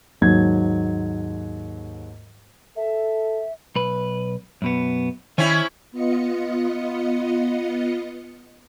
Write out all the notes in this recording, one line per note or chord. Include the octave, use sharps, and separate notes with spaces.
D#2 G#2 F#3 G#6
A4 E5
B1 B4
F#2 B2 B3
D#3 C4 C#4 E4 G#5
B3 F4 D#5 C#7